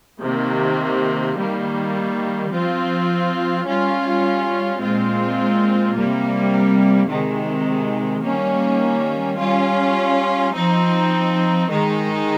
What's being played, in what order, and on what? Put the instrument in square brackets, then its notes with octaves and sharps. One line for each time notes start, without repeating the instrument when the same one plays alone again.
[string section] C3 D#3 A#3
D#3 G3 A#3
F3 C4 F4
G3 C#4 F4
A#2 G#3 C4 F4
C3 G3 A#3
C3 D#3 G#3
D#3 G3 A#3 C#4
G3 C#4 F4
F3 C4 D#4
D#3 G#3 D#4